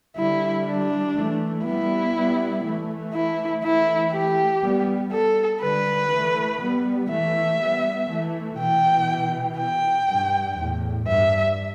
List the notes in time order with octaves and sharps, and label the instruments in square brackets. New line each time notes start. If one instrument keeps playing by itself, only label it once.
[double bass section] D3 G3 [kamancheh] E4
[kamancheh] D4
[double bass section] E3 A3
[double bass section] G3 B3 [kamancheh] E4
[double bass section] G3 B3
E3 A3
[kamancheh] E4
[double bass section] E3 A3 [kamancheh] E4
[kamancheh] G4
[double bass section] G3 B3
[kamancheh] A4
[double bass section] D3 G3 [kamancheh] B4
[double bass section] E3 A3
G3 B3
[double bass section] E3 A3 [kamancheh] E5
[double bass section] G3 B3
E3 A3
[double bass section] B2 E3 [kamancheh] G5
[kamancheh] G5
[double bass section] G2
E2 A2
[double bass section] G2 [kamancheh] E5